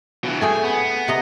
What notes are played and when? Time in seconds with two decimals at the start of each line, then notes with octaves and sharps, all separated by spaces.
0.24 B2 E3
0.41 A3 G#4 G5 G#5
0.64 B3
1.08 C3 D#5 A#5